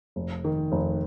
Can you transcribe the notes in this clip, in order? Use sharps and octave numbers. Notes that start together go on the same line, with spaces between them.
F1
D#3
F1